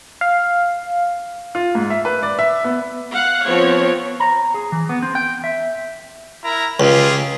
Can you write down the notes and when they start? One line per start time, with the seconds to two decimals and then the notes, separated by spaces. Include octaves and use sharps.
0.21 F5
1.55 F4
1.75 G#2
1.90 E5
2.05 B4
2.23 D5
2.39 E5
2.64 B3
3.13 F5 F#5
3.46 F3 B3 C4 C#5
4.20 A#5
4.54 G#4
4.72 E3
4.89 B3
5.02 C4
5.15 G5
5.44 E5
6.44 E4 A#4 A#5
6.80 C#2 F4 G4 G#4